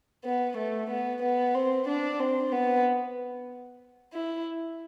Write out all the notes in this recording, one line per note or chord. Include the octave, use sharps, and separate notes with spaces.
B3
A3
B3
B3
C4
D4
C4
B3
E4